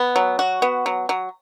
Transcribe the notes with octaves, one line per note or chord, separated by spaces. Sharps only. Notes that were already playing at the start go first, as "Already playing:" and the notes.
Already playing: B3
F#3
F#4
B3
F#3
F#3